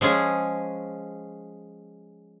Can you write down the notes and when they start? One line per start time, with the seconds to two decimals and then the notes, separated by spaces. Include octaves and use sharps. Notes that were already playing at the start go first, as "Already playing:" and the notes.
0.01 F3 G#3 C#4 G#4